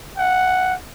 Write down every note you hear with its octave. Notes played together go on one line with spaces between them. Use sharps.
F#5